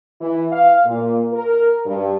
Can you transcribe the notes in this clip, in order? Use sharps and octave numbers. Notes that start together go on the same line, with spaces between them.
E3
F5
A#2
A#4
G2